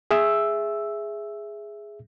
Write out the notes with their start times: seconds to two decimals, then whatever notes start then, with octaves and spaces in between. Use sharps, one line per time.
0.11 G#4 E5 E6